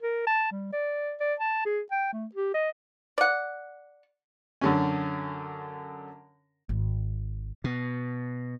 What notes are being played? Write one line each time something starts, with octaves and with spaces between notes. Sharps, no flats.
A#4
A5
G3
D5
D5
A5
G#4
G5
A3
G4
D#5
D5 F#5
F#2 D3 C#4
G#1
B2